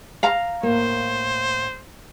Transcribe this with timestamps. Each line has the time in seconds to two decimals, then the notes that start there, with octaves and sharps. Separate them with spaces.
0.23 F5 A#5
0.63 A2 A#3 C5